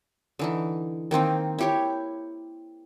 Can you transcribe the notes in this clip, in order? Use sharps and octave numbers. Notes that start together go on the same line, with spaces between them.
D3 E3 D#4
D#3 A#3 C4 D#4
E4 G4 C#5